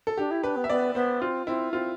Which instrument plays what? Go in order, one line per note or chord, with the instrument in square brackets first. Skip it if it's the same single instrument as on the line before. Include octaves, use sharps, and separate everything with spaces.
[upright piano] A4
[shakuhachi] D4 [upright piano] G4
[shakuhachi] E4
[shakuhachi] D4 [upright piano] B4
[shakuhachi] B3
[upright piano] E5
[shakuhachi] B3 [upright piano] D5
[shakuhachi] B3 [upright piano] C5
[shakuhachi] C4 [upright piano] F4
[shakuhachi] C4 [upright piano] E4
[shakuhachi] C4 [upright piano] F4